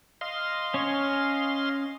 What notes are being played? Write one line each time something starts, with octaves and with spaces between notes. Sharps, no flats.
D#5 F5 C6
C#4 C#5